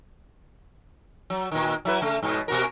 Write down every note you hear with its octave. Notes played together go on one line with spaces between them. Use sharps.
F#3
A#2 D#3
F#3 E4 B4
C#3 A3
G#2 B2
B2 F#4 A#4